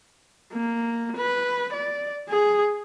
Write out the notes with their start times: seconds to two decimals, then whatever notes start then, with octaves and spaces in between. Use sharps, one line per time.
0.53 A#3
1.17 B4
1.73 D5
2.29 G#4